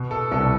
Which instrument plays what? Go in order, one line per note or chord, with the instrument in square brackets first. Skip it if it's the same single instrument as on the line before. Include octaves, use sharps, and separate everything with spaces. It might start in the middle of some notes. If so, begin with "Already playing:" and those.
Already playing: [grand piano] B2
A4
C2 A4